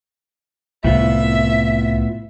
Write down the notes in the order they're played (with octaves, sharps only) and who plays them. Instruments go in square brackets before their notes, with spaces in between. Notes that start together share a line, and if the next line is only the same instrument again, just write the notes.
[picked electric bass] C2 [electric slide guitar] A2 B3 F4 [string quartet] E5